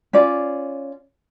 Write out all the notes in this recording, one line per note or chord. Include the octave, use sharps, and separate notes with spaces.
C#4 F4 D5